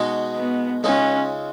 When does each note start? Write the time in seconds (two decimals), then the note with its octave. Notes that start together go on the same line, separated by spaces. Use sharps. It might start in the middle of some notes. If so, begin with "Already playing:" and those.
Already playing: B2 G#3 D#4 F#4
0.36 B3
0.84 C#2 C#3 G#3 C#4 D#4